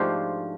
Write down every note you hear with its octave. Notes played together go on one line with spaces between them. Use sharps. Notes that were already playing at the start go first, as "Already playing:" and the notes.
Already playing: G#2 F3 A3 D4 F4 G4